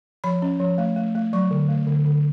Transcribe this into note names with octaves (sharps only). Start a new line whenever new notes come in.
F3 B5
C#4
F3
A3
A3
A3
F#3 C#6
D3
A3
D3
D3